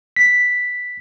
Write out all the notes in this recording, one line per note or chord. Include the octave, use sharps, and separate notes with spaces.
B6